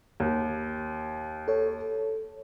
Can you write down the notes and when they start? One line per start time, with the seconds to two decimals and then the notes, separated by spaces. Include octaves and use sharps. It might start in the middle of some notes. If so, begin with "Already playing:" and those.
0.20 D#2
1.48 A4 C#5